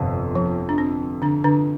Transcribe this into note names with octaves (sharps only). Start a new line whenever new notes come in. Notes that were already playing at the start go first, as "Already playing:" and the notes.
Already playing: G1 F2 C3
F3
D4
C4
D3 D4
D3 D4